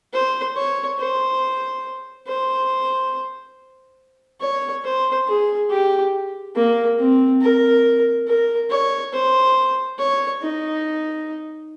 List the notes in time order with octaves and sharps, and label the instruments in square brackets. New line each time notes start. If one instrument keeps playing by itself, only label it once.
[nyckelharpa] C5
C#5
C5
C5
C#5
C5
G#4
G4
A#3
C4
A#4
A#4
C#5
C5
C#5
D#4